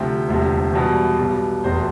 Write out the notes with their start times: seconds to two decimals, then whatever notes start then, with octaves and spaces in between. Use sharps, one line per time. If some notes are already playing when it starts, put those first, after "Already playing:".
Already playing: D2 C3 F3 G5
0.28 E1 D2 C3 F3
0.73 E2 B2 G3
1.19 B1 B2 G3
1.64 F1 E2 B2 C5